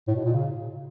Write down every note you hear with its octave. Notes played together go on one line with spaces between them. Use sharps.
A2
B2
A#2
C#3